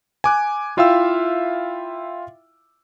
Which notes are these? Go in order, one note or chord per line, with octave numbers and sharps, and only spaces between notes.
G#5 D6 F#6
E4 F4 E5 F5 G5 E6